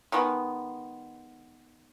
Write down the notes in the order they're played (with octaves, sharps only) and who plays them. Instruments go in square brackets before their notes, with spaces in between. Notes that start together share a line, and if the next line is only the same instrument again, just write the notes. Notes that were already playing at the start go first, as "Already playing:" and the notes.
[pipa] D#3 G#3 B3